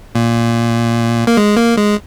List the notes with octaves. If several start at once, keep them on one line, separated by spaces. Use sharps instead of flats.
A#2
A#3
G#3
A#3
G#3